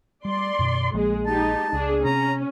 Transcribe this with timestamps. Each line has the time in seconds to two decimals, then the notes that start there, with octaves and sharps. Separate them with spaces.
0.25 G3 D5 C6
0.59 F#2 B2
0.93 A#1 F3 G#3 A#3 G#4
1.26 G#3 D#4 G4 A5
1.73 C#2 D4 G#4
2.05 C3 C#4 A#5